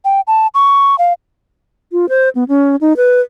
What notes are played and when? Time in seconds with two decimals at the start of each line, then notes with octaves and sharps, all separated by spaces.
0.05 G5
0.27 A5
0.54 C#6
0.99 F5
1.92 F4
2.09 C5
2.35 B3
2.48 C#4
2.81 D#4
2.97 B4